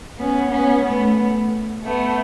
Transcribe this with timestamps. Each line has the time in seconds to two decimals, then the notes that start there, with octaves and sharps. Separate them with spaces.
0.19 B3 C#4
0.52 B3 C#4
0.85 A3 B3
1.84 A3 B3